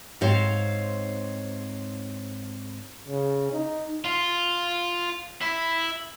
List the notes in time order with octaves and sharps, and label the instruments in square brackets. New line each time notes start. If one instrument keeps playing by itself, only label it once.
[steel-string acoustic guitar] G#2 C4 C5 C#5 F5
[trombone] C#3
D#4
[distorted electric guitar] F4
E4